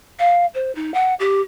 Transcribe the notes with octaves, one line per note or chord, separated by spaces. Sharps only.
F5
C5
D#4
F#5
G4